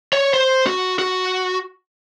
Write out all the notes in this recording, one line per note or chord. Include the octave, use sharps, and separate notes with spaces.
C#5
C5
F#4
F#4